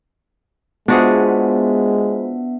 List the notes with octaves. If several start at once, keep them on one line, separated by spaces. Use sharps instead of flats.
G#3 B3 D4 F4 F#4 G#4 C5 E5